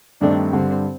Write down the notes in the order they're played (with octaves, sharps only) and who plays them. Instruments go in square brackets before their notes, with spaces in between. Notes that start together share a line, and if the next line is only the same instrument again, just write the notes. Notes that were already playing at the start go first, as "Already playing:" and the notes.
[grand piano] G2 D#3 A3 C4 [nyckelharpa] D4
[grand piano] G2 D3 G3 [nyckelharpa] C4